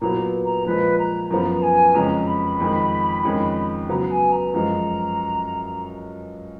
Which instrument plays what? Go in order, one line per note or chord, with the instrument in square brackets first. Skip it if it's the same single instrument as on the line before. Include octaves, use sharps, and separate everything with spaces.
[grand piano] A#2 F#3 B3 [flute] A#5
[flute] A#5
[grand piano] A#2 F3 G#3 [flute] B4
[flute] A#5
[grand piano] F#2 F3 B3 [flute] A#5
[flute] G#5
[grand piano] F2 C#3 G#3 C#4 [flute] A#5
[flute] B5
[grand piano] F2 D#3 G#3
F2 D#3 G#3 C#4
[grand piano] C#3 F#3 B3 [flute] A#5
[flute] G#5
A#5
[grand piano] F#2 F3 G#3 [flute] A#5